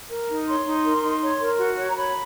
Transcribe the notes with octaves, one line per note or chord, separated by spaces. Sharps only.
A#4
D#4
C#5 C6
D#4
A#4
D#4
C#5
A#4
F#4
C#5
A#5
C#5 B5